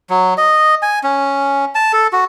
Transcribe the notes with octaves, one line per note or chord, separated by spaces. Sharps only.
F#3
D#5
G#5
C#4
A5
A4
F#4